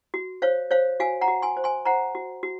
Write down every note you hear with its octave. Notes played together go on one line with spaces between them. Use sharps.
F#4
C5 C#5 F5
C5 C#5 F5
F#4 F5 G#5
F#5 A#5
F#4
G#5 C6
C5
G#5 C6
C5 F#5 A#5
F#4
F#4